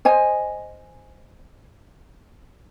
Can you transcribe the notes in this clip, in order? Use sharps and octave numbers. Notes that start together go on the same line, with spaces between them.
C5 D#5 G#5